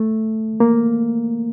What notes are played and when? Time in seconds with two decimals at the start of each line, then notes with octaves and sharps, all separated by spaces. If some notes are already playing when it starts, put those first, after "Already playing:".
Already playing: A3
0.60 A#3